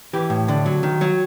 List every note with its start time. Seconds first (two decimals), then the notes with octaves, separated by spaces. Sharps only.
0.13 E3 G4
0.30 A2
0.48 D3
0.66 F#3
0.83 D#3
1.01 F#3